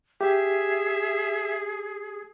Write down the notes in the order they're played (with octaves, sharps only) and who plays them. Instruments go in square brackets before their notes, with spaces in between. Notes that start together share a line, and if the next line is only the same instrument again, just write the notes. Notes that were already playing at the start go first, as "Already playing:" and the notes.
[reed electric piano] G4 [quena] G#4 [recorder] E5